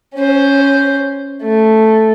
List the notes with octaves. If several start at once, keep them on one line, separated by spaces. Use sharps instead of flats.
C#4 C5
A3